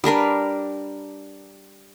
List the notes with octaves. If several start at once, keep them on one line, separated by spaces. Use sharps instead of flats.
G3 D4 A#4 B4